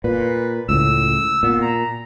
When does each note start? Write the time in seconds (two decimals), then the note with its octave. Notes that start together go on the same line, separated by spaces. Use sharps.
0.04 A#2 B4
0.69 C#2 A2 E6
1.43 A#2 B3
1.62 A#5